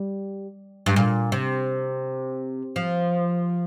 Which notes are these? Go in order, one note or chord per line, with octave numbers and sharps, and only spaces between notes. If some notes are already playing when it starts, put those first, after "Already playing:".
Already playing: G3
G2
A#2
C3
F3